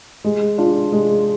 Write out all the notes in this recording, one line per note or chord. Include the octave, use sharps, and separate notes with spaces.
G#3
D4 F4
G#3